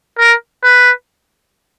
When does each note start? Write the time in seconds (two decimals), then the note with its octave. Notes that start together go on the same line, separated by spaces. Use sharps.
0.19 A#4
0.64 B4